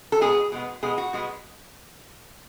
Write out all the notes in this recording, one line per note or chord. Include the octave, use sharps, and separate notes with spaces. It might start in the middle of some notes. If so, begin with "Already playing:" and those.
A4
B2 G#3 B3 G#4
B2 G#3 B3
B2 G#3 B3 G#4
F#4
B2 G#3 B3